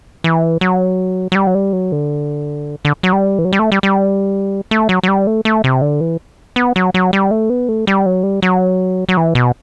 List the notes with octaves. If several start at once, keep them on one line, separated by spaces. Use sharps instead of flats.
E3
F#3
F#3
G3
F#3
G3
F#3
D3
D3
F#3
G3
E3
F#3
G3
A3
G3
G3
A3
F#3
F#3
G3
A3
A3
C3
D3
E3
B3
F#3
F#3
G3
A3
B3
A3
G3
F#3
G3
F#3
F#3
E3
B2